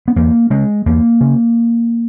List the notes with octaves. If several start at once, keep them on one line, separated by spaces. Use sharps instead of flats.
B3
E2 A#3
C#3 G#3
E2 A#3
C#3